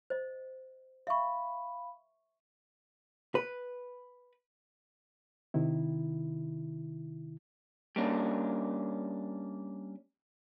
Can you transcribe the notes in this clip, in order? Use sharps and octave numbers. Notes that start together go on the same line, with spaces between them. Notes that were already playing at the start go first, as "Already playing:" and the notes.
C5 D#5
E5 F5 B5 C#6
B4
C3 D#3 E4
G3 A#3 C#4 D4